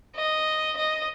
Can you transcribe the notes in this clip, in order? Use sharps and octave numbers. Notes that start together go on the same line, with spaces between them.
D#5
D#5